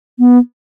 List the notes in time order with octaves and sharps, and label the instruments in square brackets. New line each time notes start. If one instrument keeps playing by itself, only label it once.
[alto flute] B3